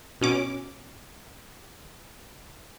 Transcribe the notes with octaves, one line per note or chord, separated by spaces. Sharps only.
B2 C#4 D6